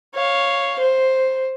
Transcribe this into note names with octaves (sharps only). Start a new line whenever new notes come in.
C#5 F5
C5